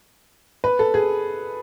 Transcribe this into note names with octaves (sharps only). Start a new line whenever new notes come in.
B4
A4
G#4